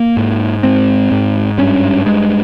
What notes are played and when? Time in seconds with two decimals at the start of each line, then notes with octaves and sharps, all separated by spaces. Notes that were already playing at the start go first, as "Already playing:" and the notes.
Already playing: A#3
0.17 G#2
0.63 G#2 C4
1.11 G#2
1.58 G2 C#4
2.05 G2 G#3